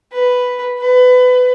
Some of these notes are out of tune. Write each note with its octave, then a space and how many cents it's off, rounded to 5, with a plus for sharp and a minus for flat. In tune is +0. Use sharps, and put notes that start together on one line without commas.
B4 +5
B4 +25